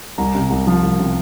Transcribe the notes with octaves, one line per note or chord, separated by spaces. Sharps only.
C2 A#5
C3
C2
F3
C2
C3